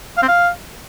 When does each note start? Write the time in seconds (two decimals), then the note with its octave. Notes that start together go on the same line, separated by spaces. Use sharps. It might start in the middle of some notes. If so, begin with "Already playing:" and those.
0.17 F5
0.23 C4
0.28 F5